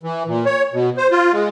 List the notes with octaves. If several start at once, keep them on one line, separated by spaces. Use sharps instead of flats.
E3
A#2
C#5
B2
C5
F4
G#3